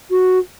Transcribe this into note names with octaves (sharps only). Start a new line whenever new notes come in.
F#4